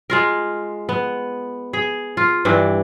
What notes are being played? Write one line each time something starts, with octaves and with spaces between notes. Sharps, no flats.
G#3 F4 A#4
B3
G#4
F4
G2 E3 D4